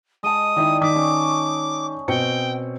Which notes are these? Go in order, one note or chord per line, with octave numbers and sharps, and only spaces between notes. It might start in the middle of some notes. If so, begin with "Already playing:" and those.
G#3 A5 D#6
D#3 E4 D5 D#5 G5
D#3 D6 D#6 B6
C#4 C#6
B2 C4 G5 C#7